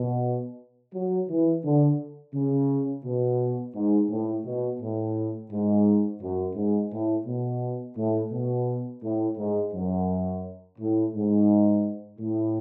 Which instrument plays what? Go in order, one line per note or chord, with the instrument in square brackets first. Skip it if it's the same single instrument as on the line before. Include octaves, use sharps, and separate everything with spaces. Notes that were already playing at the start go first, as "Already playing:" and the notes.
Already playing: [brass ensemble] B2
F#3
E3
D3
C#3
B2
G#2
A2
B2
A2
G#2
F#2
G#2
A2
B2
A2
B2
A2
G#2
F#2
A2
G#2
A2